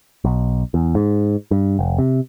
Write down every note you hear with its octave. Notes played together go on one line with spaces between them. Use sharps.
B1
E2
G#2
G2
F1
C3